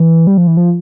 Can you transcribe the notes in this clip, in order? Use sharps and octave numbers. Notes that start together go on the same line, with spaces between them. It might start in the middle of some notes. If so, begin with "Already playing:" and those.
Already playing: E3
G3
F3
E3
F3